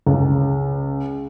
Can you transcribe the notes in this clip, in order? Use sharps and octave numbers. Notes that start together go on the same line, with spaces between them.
C#2